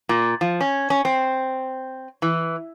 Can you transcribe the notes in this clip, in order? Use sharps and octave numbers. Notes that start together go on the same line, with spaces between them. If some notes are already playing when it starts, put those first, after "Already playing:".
A#2
F3
C#4
C#4
C4
E3